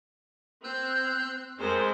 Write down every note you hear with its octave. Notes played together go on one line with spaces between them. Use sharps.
C4 E6 F#6 G6
F2 G#3 A#4 C5